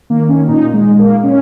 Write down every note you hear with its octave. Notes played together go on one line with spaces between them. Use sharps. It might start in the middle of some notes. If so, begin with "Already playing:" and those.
D#3 A#3
C#4
A#2 D#4
G#3
A#3
A#2 C#4